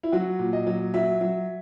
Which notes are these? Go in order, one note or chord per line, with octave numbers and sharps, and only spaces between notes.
E4
F#3 F#4
A#2
D#5
F#3
F#3 E5
F#3